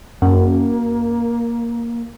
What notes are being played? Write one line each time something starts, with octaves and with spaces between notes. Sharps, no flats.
F#2 A#3